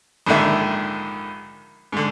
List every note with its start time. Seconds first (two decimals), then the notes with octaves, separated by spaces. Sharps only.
0.26 A#1 G#2 D3 D#3 E5
1.92 G#2 D3